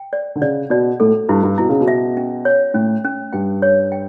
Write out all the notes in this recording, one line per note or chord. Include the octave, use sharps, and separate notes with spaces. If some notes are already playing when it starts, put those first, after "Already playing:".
Already playing: G5
D5
D3
C#3 D5
B2 D5
A2 A4
G2 E4
G2
B2 E4
C#3
B2
E5
C#4
C#5
A2 C#4
C#4
G2 G5
C#5
G5